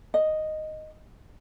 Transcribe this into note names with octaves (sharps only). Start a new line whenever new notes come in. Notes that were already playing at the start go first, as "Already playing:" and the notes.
D#5